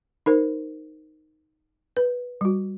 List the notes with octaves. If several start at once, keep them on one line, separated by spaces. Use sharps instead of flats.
D#4 A#4 C5
B4
G3 F#4